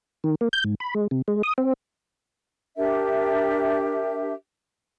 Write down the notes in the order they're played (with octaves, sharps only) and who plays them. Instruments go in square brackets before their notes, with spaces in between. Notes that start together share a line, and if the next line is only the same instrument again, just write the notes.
[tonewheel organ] D#3
A#3
G6
G#2
B5
G#3
C3
G#3
D#6
C4
[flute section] D4 G4 A#4 E5